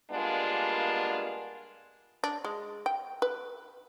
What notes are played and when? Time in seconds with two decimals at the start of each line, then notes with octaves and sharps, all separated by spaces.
0.11 G3 G#3 A#3 B3 D4 F4
2.24 D4
2.44 G#3
2.86 G5
3.22 B4